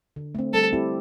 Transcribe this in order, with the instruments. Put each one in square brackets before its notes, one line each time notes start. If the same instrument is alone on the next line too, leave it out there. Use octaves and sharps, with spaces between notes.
[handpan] D3
A3 C4
[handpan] G3 [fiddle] A4
[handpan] C4 E4 G4